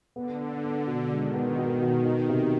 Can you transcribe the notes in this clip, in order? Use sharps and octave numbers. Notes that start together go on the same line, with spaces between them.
D3 B3
B3
B3
B2
D#3 G#3
B3
B2
B2
D#4
C3